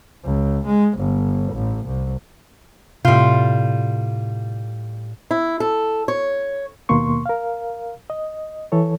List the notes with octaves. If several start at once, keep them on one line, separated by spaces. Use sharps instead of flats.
C#2
G#3
G1
A1
C2
A2 C3 G3 F4 G6
E4
A4
C#5
D#2 B2 A#3 C6 C#6
A#4 F5
D#5
E3 A4 C#5